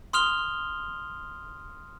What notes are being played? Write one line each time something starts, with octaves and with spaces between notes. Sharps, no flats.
C6 D#6 F6 F7 G7